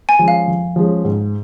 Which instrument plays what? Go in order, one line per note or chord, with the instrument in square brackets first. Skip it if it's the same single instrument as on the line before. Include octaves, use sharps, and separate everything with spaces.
[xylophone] G#5
[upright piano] F3 G#3 C#4
[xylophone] F5
[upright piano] F2
F3 G#3 C#4
G#2